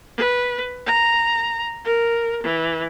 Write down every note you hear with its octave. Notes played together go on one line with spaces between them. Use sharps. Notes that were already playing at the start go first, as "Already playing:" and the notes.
B4
A#5
A#4
E3